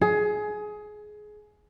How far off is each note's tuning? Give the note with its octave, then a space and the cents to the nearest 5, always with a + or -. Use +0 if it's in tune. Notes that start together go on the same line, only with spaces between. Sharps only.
G#4 +20